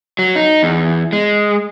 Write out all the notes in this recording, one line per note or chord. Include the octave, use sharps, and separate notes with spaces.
F#3
D#4
E2
G#3